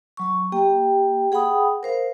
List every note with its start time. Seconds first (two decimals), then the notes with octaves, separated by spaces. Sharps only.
0.17 F#3 C#6
0.52 A#3 G4 G5
1.32 G#4 F#5 G5 B5 D#6
1.83 A#4 C5 F5